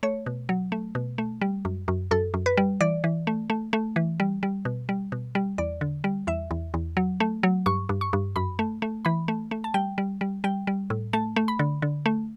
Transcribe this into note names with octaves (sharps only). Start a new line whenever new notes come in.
A3 C#5
B2
F#3
A3
B2
A3
G3
F#2
F#2
F#2 A4
F#2
B4
G3
E3 D5
E3
A3
A3
A3
E3
G3
G3
B2
G3
B2
G3
E2 D5
D3
G3
E2 E5
E2
E2
F#3
A3
F#3
G2 C#6
G2
C#6
G2
F#2 B5
A3
A3
E3 B5
A3
A3
A5
G3 G5
G3
G3
G3 G5
G3
A2
A3 A5
A3
B5
D3
D3
A3